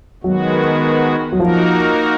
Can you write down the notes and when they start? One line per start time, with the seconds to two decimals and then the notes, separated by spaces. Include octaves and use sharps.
0.23 D#3 F#3 G#3 B3 F#4
1.32 F#3
1.39 F3 A#3 D#4 F#4 A#4